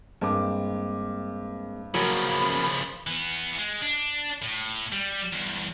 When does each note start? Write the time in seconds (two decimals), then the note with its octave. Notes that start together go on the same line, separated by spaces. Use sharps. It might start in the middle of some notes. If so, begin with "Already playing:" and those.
0.21 G2 G#3 A#3 C4 D6
1.94 C#3 F3 F#3 A#3 B5
3.07 E3 B3
3.58 G#3
3.82 D4
4.42 A2
4.92 G3
5.33 E2 G2